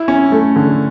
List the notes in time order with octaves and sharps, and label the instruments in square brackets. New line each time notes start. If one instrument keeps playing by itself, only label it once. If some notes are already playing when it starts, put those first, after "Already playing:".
Already playing: [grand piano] E4
C#4
A3
D3